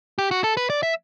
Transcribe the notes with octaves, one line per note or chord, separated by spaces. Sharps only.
G4
F#4
A4
B4
D5
E5